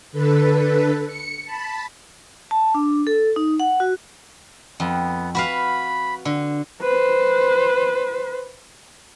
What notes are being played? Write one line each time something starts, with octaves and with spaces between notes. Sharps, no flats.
D3 A4 B4
C#7
A5 B5
A5
D4
A4
D#4
F#5
F#4
F2 B3
F#4 B4 F5 B5
D3
B4 C5